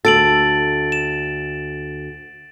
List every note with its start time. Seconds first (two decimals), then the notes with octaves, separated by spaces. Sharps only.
0.05 D2 A4 A6 D7 F#7
0.92 E7